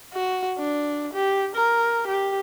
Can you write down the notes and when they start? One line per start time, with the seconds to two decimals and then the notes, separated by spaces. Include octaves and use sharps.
0.13 F#4
0.58 D4
1.14 G4
1.55 A#4
2.08 G4